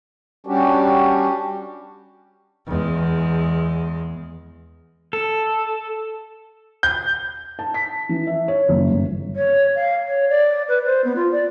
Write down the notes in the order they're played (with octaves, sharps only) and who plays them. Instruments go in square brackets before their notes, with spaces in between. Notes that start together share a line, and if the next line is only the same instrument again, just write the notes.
[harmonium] G3 C#4 D4 F#4 G4
[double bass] E2 G#3
[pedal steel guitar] A4
[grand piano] G6
[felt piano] A5
B6
E3
E5
C#5
F#1
G1
[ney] C#5
F5
C#5
D5
B4
C5
B3
F4
D5